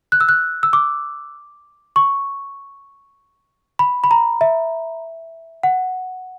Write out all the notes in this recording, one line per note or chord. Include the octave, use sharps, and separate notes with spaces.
F#6
E6
F#6
E6
D6
C#6
B5
B5
A#5
E5
F#5